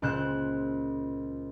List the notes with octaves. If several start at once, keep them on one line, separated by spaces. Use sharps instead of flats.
C#2 A#2 C5 F#6 G6 E7